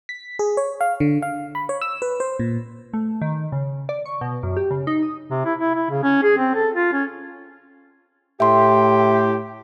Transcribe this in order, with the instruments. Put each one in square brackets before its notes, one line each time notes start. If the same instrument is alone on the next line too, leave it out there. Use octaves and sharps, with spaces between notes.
[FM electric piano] B6
G#4
C#5
F5
D3
F5
B5
C#5
E6
B4
C5
A#2
[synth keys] A3
D#3
C#3
D5
C#6
B2
F#2
G4
C#3
D#4
D#6
[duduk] C3
E4
E4
E4
C#3
C#4
G#4
C4
A4
F4
C#4
[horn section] A2 G4 [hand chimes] E5 C6